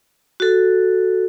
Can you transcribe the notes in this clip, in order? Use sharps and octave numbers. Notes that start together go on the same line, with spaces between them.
F#4 A4